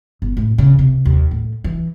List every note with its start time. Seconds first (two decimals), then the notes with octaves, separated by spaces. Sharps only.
0.22 G1
0.37 A2
0.58 C#3
0.79 C3
1.05 D#2
1.31 A2
1.64 E3